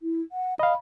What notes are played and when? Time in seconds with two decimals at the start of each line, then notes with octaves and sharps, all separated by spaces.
0.02 E4
0.32 F#5
0.59 D#5 F5 B5